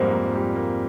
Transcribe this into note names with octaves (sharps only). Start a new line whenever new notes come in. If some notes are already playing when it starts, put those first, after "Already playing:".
Already playing: F2 G#2 F3 G3 A#3
G#2
G3
A#3